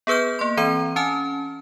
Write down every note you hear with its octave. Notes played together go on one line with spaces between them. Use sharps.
B3 G#4 B4 F6 G6
A#3 C6
E3 C4 A#5 D#7
C#4 G#5 A5 F6